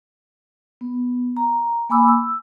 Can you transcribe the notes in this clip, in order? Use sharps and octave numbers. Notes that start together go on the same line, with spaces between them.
B3
A#5
A#3 G#5 B5 D6 E6
E6